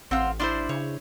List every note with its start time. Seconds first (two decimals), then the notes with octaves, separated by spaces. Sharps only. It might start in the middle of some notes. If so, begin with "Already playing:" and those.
0.11 A1 C4 F5 F#5 C6 E6
0.39 D4 E4 C5 D5 C6 F6
0.69 C#3 C#5